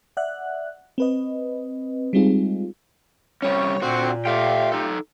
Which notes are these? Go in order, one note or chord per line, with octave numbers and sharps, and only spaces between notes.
D5 E5 F#5 F#6
C4 B4 D#5
G3 G#3 C4 D#4 F4 G#4
C3 G3 C#4 C#5
A#2 D3 C4 F#4
A3 F4 G4 E5 F5 G5
D#4 A4